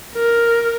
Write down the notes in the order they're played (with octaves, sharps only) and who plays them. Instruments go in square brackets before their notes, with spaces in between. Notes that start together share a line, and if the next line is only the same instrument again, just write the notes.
[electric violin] A#4